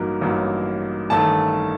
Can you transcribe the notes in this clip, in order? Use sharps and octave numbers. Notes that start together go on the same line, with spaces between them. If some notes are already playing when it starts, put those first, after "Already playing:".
Already playing: A1 G2 F#3 A#3 D#4
A1 G2 F#3 A#3 D#4
A1 G2 D#3 A3 A5